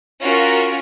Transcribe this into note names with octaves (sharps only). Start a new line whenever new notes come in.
C#4 F4 F#4 A#4 F5